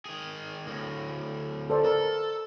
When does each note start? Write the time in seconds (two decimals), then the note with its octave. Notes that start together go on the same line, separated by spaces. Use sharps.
0.05 D#3 G#4
0.67 D2 A2
1.70 A4 C5 D5
1.85 A4 A#4